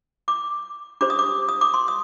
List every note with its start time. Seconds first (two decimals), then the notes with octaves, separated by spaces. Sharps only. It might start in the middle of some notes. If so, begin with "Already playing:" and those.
0.28 D6
1.01 D4 G4 C5 D6
1.10 D#6
1.19 D6
1.49 D#6
1.61 D6
1.74 C6
1.88 D#6